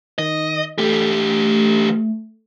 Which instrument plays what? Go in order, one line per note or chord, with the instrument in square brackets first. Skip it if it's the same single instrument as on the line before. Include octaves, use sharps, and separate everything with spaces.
[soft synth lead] D#3 [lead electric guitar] D#5
[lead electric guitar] E3 G4 [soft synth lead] A3